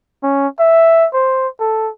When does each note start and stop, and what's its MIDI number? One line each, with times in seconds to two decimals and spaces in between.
0.23 0.47 61
0.59 1.06 76
1.13 1.48 72
1.60 1.90 69